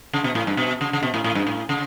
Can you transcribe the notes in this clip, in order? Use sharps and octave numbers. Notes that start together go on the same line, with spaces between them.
C#3
B2
A2
G2
B2
C#3
C#3
B2
A2
A2
G2
A2
C#3